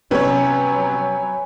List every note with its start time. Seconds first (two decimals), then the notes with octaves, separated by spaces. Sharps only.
0.11 C3 F#3 B3 C#4 B4 C#5 G#5